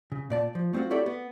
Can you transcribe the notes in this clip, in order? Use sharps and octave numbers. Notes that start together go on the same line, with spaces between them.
C#3
A#2 D5 A5
F3
A3 C4 D#4 F4 F#4
E4 F#4 G4 A4 C#5 D5
B3